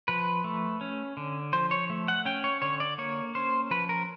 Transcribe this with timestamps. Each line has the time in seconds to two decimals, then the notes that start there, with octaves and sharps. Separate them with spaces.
0.08 F3 B4
0.44 A3
0.81 C#4
1.17 D3
1.53 F3 C5
1.71 C#5
1.90 A3
2.08 F#5
2.25 C#4 G5
2.44 C#5
2.62 D3 C#5
2.80 D5
2.98 A#3 C#5
3.35 C#4 C5
3.71 F3 B4
3.89 A#4